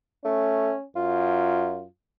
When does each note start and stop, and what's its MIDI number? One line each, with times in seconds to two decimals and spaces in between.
0.25 0.72 57
0.25 0.84 61
0.96 1.85 42
0.96 1.86 65